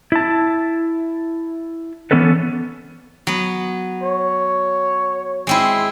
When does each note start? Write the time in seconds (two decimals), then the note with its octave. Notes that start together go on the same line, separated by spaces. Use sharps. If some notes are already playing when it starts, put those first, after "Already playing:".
0.12 E4 A5
2.11 E3 B3 C#4 A4 B4
3.27 F#3 B3
4.03 C#5
5.47 G#3 C4 E4